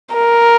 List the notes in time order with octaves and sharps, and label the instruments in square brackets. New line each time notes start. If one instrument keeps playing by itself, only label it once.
[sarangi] A#4